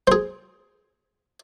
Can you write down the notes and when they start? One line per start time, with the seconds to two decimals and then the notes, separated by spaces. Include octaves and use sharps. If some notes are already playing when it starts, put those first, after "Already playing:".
0.07 G#4 C5